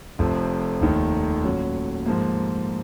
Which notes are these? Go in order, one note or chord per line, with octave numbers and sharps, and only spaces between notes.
F1 F2 F3
F1 D#2 D#3
A#2 F#3 C#4
G#2 F3 A#3